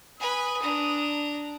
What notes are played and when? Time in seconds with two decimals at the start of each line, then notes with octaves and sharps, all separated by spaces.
0.20 B4 G#5 D#6
0.62 D4 A#5